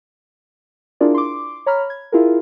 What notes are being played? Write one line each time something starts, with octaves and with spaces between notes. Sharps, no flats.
D4 E4 F4 G#4 A#4 D5
C6 D6
C#5 A#5 B5 F6
G#6
E4 F4 G#4 A#4